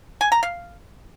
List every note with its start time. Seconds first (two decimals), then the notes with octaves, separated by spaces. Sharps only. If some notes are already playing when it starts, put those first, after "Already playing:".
0.21 G#5
0.32 A#5
0.43 F5